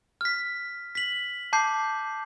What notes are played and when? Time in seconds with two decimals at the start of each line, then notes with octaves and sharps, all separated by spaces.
0.21 F6 B6
0.95 B6 F#7
1.53 A5 D6 G6 C7